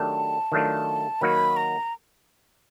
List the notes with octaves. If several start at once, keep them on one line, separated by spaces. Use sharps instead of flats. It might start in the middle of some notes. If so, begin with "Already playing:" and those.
Already playing: D#3 F#3 A3 D4 G4 A5
D#3 F#3 A3 D4 F4
D#3 F#3 A#3 D#4 F#4 B5
A#5